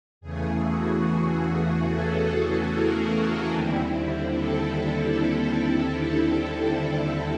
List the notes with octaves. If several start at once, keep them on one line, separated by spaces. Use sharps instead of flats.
E2 C#3 E3 A3 G#4
F#4
A4
A#4
D#2 D3 G3 C4 E4
A4